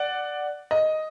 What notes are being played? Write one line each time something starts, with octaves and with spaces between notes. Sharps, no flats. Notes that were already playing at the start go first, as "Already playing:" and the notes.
Already playing: D5 F#5
D#5